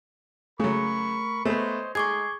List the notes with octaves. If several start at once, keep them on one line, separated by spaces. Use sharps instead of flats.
C#3 F#3 A3 A#4 B5 C#6
A3 B3 C5 C#5 D#5 G#5 C6
G#3 A3 D#4 G#4 C#6 D6 G#6 C7